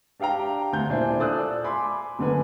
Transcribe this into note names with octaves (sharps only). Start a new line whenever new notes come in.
D4 G4 F5 G5 A#5
D2 G6
D#1 D4 E4 C5 G#5
F4 A4 D5 D#6 E6 F#6
G#5 B5 C6 D6
F#1 D3 B4 G#5